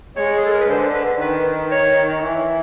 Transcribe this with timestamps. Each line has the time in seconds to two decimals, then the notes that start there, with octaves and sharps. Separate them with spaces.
0.17 G#3 C#5
0.37 G#4
0.45 A4
0.53 A#4
0.61 B4
0.69 D3 C5
0.94 B4
1.20 D#3 B4
1.71 C#5
2.23 E3